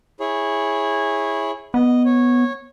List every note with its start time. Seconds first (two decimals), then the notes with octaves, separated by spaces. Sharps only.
0.20 E4 G#4 C#5
1.74 B3 D#5
2.05 C#5